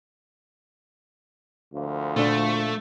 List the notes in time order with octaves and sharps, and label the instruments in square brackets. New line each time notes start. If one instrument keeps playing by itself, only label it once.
[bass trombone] D2 [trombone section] F3 A#3 F4
[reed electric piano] A#2 D4 [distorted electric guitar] A3